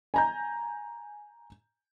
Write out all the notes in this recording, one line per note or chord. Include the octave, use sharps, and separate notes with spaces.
G#5 A#5 G6